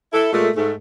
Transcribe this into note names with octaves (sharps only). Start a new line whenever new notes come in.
E4 A4
A#2 G#3 A3
G#2 A3